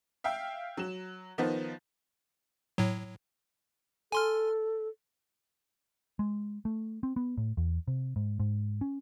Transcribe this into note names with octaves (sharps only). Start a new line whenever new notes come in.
E5 F5 G5
F#3 E7
D#3 F3 B3 D#4
A2 F#3
A4 G#5 C6 F6
G#3
A3
C4
B3
A2
E2
C3
G#2
G#2
C#4